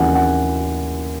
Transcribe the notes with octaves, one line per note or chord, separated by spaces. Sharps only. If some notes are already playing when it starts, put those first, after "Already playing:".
Already playing: D#2 C#3 E3 F#5 G#5
F#5